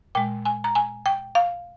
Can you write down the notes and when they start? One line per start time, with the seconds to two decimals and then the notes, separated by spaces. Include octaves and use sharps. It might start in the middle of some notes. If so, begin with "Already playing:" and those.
0.15 A#2 G#3 G5
0.46 G#5
0.64 A#5
0.75 G#5
1.06 G5
1.35 F5